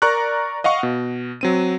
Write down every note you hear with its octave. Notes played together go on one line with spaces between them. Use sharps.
A#4 D5 A#5 C#6 F#6
D#5 F5 F#5 C#6
B2
F#3 C4 D#7